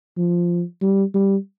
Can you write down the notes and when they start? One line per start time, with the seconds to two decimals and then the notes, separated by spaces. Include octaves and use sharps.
0.17 F3
0.81 G3
1.14 G3